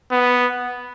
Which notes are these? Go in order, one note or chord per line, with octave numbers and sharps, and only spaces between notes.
B3